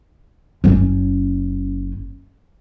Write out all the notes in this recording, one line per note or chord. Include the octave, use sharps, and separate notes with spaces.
F#1 C#4